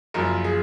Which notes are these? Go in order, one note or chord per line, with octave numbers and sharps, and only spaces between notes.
F#1 F#2 F3 A#4
G#4